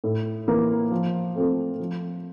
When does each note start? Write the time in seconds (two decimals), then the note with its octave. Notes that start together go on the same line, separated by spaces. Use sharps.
0.04 A2
0.47 E3 A#3
0.92 F3
1.35 A3 C4 F4 A4
1.80 F3